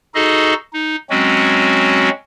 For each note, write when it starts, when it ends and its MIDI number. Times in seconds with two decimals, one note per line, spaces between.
0.15 0.54 63
0.15 0.54 66
0.15 0.54 68
0.15 0.54 69
0.15 0.54 75
0.73 0.96 63
1.10 2.09 54
1.10 2.09 56
1.10 2.09 60
1.10 2.09 61
1.10 2.09 66